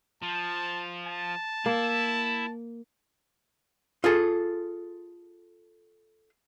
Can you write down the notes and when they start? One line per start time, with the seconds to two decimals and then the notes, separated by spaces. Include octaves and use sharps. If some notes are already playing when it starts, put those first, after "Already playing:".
0.23 F3 A5
1.06 A5
1.66 A#3 E4
4.04 F4 G#4 A4